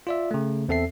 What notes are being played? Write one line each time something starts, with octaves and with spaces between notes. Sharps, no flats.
F4 D5 E5
C#3 A3
E2 C4 A4 E5 C7